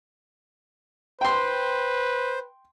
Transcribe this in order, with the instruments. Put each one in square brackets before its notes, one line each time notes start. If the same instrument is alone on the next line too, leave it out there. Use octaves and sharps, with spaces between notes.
[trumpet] B4 [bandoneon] C5 [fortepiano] G5 C6